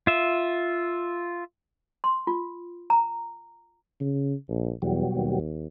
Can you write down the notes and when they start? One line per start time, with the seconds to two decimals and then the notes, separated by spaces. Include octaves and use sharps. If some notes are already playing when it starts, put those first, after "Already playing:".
0.07 F4 E5
2.04 C6
2.27 F4
2.90 A#5
4.01 C#3
4.49 A#1
4.82 E2 B2 F#3 G3
5.16 D#2